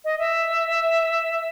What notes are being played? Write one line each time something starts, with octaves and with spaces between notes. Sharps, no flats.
D#5
E5